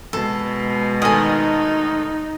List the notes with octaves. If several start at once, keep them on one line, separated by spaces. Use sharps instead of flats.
B2 G#3 A4
D2 D#3 D#4 A4 D#5 G#5